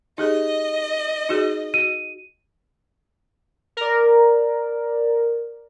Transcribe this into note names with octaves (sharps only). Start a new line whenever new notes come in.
D#4 G4 G#4 D#5
D#4 F#4 G#4
F#4 D#7
A#4 D5